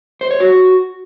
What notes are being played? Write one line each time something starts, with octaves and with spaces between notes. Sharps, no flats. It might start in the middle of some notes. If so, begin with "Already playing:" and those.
C5
C#5
F#4